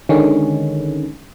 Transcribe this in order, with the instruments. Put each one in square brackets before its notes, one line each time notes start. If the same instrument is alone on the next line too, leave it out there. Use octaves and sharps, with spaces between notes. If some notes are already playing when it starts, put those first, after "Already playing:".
[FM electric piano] D3 D#3 G#3 C#4